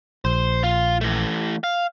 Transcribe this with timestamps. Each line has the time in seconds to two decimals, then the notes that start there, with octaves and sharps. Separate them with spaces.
0.25 A#1 C5
0.64 F4
1.01 E3 A3
1.64 F5